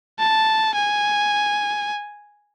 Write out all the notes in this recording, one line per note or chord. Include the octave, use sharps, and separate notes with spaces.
A5
G#5